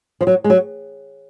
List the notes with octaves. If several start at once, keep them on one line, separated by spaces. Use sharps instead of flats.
F3
F#3
G#3
F#3